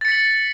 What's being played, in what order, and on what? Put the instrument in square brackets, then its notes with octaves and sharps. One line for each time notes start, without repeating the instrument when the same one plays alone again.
[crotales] A6
C#7
B6
F#7